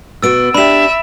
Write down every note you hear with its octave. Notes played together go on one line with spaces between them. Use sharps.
B2 B3 F#4 E6 A6 D7
D4 G4 E5 B5 E7